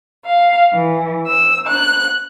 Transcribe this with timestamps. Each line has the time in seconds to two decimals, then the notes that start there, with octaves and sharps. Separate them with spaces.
0.26 F5
0.74 E3
1.26 E6
1.66 F#6